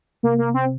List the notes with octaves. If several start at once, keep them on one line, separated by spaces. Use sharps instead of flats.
C3 A#3
A#3
C4